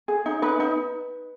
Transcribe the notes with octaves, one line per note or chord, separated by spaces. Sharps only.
G#4
D#4
D#4 B4
D#4